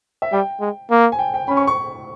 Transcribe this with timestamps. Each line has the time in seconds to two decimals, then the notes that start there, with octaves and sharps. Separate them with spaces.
0.22 E5
0.33 G3 G5
0.61 G#3
0.91 A#3
1.12 G#5
1.19 G5
1.34 G5
1.48 C#4 B5
1.57 C#6
1.67 C#6